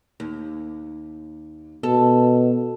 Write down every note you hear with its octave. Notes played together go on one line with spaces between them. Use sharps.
D#2
B2 A4